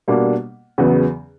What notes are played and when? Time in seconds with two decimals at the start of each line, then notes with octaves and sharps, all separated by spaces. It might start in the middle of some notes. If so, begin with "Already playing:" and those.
0.08 B2 G3 A#3 D4
0.78 E2 C#3 F#3 B3